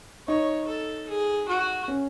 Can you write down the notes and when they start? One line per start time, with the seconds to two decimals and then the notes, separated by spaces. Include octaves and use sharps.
0.27 D#4 C#5
0.67 A4
1.08 G#4
1.48 F#4
1.88 C#4